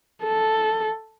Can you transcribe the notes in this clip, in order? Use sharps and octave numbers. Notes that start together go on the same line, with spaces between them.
A4